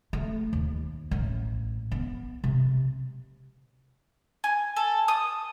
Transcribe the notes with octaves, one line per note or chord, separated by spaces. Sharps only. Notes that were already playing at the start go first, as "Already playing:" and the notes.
A3
D#2
A1
B3
C3
G#5
A4
D#6